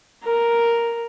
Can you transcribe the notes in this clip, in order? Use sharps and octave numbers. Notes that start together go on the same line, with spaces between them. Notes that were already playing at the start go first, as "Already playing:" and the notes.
A#4